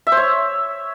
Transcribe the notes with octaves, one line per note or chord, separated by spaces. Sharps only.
E5
C5
C#5